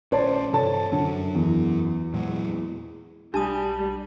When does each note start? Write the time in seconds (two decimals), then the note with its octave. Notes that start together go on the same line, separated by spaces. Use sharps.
0.12 A#1 C#4 C5 D5 A5
0.53 G2 C3 A4 C#5 A5
0.92 F#2 D3 F#3
1.35 E2
2.14 A#2 F#3 G#3
3.34 B1 G3 D4 G4 A5 D#6